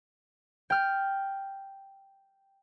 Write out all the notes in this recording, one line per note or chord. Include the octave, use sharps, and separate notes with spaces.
G5 F6